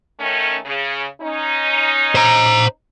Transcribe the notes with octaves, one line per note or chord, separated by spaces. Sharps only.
D#3 A3 C#4
C#3
C#4 D#4
C5 A#5